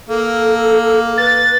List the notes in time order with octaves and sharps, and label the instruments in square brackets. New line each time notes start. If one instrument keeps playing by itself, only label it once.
[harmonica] A#3 [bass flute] A4
[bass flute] B4 [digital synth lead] A6